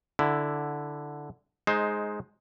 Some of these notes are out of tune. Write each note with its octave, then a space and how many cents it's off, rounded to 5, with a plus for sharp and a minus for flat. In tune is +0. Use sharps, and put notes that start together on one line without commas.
D3 +0 E4 +0
G#3 +10 D#4 +0 C5 +10